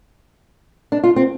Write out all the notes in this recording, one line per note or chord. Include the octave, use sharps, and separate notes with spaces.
D4
F4
C4